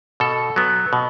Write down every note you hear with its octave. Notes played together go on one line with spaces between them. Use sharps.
B2 A4
F#3 B3
B2